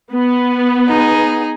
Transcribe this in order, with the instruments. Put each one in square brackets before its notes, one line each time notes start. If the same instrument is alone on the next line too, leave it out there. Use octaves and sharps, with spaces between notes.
[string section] B3
[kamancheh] D#4 G#4